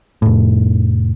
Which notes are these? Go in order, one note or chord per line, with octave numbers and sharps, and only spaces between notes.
F1 A2